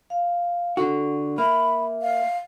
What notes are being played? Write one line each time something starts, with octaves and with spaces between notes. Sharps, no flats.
F5
D3 F#4 A4
A#3 E5 B5
F5